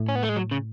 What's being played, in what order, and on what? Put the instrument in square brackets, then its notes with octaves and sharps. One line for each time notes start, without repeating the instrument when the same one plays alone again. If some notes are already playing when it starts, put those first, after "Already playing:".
Already playing: [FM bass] A2
[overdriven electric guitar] C#4
B3
A3
G#3
F#3
C#3